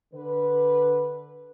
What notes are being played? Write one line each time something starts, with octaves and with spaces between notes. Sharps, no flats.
D3 B4